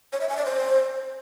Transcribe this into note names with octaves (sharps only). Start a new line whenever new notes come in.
C#5
E5
G#5
D5
C5